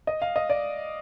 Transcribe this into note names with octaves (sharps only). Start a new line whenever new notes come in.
D#5
F5
D#5
D5